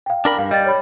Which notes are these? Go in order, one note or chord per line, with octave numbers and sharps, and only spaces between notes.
F5 G5
D4 A#4 B5
G2 F5
G3 D#5 G5 A6
C#5 B5